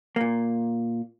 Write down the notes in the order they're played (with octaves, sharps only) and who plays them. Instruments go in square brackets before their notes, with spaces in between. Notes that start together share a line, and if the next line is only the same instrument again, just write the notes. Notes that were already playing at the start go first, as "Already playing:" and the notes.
[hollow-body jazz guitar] A#2 A#3